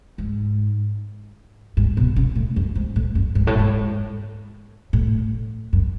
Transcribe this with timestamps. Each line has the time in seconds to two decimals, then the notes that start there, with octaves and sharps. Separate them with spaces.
0.18 G#2
1.77 G#2
1.97 B2
2.16 C#3
2.35 A2
2.56 F#2
2.75 G#2
2.96 A2
3.15 F#2
3.35 G#2
3.47 A2
3.59 G#2
4.93 A2
5.73 F#2